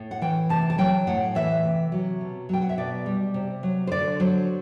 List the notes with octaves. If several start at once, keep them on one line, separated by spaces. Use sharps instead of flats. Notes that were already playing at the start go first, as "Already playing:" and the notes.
Already playing: A2
F#5
E3 G5
C3 A5
A5
F#3 G5
A2 F#5
E3 E5
C3
F#3
B2
F#3 G5
F#5
E5
B2 D5
G3
C3
F#3
C5
D3 D5
F#3 C5